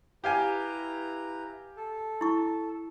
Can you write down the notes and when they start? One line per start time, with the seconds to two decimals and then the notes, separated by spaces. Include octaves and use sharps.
0.24 E4 G4 B4 F5 G#5 A#5
1.77 A4
2.21 E4 C#6